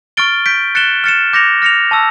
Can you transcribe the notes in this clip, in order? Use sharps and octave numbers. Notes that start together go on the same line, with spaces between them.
C#6 F6 A6 D7 G7
G6 B6 D7
F#6 A6 C#7 E7 G7
F6 A6 C#7 E7
D6 G6 A#6 C#7 F7
F6 A#6 C#7 F7
A5 C#6 E6